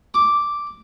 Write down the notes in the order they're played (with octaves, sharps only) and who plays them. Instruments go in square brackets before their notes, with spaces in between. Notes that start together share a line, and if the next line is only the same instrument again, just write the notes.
[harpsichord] D6